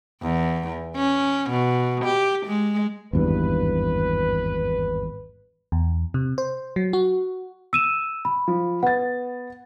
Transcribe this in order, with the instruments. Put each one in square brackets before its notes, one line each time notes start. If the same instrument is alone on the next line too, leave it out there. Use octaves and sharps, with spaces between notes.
[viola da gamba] E2
C#4
B2
G4
G#3
[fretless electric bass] G#1 E2 G2 [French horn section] B4
[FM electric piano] E2
C3
C5
F#3
F#4
[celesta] E6 D#7 E7
B5
[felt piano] F3
[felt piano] B3 A6 [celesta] F#5